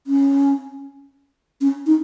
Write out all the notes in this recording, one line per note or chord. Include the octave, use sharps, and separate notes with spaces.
C#4
C#4
D#4